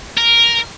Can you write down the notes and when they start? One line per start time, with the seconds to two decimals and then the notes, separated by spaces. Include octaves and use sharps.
0.18 A#4